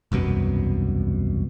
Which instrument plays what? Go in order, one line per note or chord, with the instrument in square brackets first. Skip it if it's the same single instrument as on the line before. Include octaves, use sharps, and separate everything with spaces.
[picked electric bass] E1 C2 F#2 B2